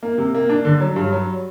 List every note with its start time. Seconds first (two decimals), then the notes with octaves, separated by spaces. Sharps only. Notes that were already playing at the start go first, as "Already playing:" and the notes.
0.03 A#3
0.18 C3
0.35 A#3
0.49 D4
0.65 D3
0.80 F#3
0.96 G2
1.12 F#3